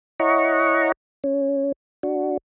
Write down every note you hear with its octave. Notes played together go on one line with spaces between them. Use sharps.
E4 C#5 D#5 F#5 A#5 C#6
C#4
D4 F#4